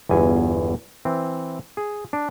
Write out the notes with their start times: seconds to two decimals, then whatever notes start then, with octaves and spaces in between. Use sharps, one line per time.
0.09 G1 E2 G#5
1.05 E3 C4
1.77 G#4
2.13 D4